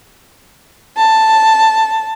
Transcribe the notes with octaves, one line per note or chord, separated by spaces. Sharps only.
A5